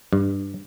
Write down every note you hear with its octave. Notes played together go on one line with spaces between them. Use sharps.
G2